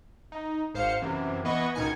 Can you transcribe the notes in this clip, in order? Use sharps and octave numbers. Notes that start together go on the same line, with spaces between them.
D#4
G#1 C5 F5 C#7
F#2 C3 E3
E3 B3 B4 D#5 C#6
C#2 B2 D#3 D#4 G#5 C#7